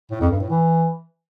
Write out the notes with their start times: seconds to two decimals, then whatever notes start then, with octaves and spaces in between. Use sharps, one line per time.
0.11 A2
0.21 F2
0.31 G2
0.40 A2
0.50 E3